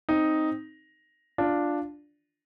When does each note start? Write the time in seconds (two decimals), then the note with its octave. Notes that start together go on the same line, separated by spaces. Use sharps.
0.09 C4 D#4
1.38 D4 F4